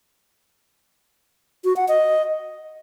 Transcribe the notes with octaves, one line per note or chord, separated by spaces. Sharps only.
F#4
F#5
D#5